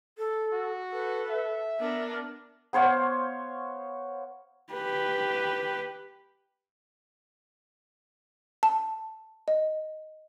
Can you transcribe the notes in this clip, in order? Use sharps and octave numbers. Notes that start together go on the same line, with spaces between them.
A4
F#4
A4 B4
E5
B3 D4 A#4
B3 C5 C#5 F5
G4 B4
A5
D#5